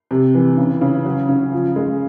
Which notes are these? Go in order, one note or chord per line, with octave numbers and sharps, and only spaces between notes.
C3
E3
C#3
C#3
F#3
C#3
F3
G#3